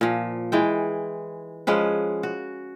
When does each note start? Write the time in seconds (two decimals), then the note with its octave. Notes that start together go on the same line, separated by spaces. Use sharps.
0.01 A#2 F3
0.52 E3 G#3 G5
1.67 F3 G#3 C#4 B4
2.23 F#4